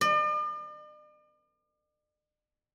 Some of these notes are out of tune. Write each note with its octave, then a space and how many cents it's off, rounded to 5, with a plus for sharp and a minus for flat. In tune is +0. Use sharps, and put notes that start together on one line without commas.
D5 +45